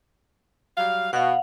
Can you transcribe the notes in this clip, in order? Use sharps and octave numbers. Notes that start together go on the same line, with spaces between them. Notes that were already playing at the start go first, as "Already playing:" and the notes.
F#3 G3 F5
B2 F5 F#5